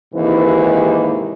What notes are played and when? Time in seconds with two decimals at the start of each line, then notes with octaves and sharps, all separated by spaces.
0.14 D#2 G#2 C3 E3